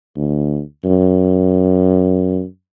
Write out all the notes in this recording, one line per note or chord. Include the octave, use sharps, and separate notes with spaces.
D2
F#2